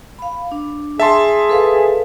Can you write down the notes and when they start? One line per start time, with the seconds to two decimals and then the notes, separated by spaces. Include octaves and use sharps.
0.19 F5 B5
0.52 D4
1.00 G#4 E5 A5 C6
1.50 A4 B4 F5